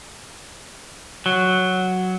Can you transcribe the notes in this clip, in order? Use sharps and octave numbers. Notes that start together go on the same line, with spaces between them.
F#3